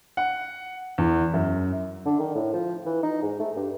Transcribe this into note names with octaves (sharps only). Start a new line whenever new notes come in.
F#5
E2
F#2
D3
D#3
A2
F3
E3
D#4
G#2
A3
G2